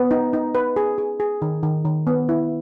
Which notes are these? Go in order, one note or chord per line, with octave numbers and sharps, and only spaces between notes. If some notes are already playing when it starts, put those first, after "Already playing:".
Already playing: B3
D#4
D#4
B4
G#4
G#4
G#4
D#3
D#3
D#3
B3
E4